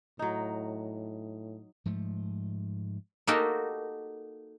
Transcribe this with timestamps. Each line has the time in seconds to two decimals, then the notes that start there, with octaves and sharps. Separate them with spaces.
0.19 A2 F#3 D#4
1.86 G#2 F3 A3
3.27 A#3 D#4 F#4 G4 A4 A#4